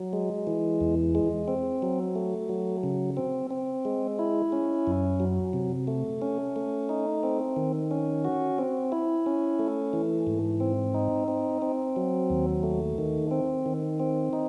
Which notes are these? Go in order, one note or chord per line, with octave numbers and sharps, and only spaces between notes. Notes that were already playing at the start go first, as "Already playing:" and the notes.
Already playing: F#3
G#3
E3
E2
G#3
C4
F#3
A3
F#3
C#3
C4
C4
G#3
E4
C#4
F#2
F#3
C3
A3
C#4
A3
D#4
C4
D#3
C#4
F#4
C4
E4
C#4
A3
E3
G#2
C4
D#4
C4
C4
F#3
D#2
A3
D#3
C4
D#3
C4
D#4